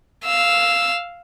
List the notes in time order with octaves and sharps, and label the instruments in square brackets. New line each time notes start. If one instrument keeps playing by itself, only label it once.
[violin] F5 E6